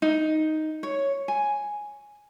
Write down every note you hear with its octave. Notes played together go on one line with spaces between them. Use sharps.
D#4
C#5
G#5